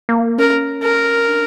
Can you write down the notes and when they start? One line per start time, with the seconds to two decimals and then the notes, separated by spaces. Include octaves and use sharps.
0.09 A#3
0.38 C#4 A#4
0.83 A#4
1.28 D4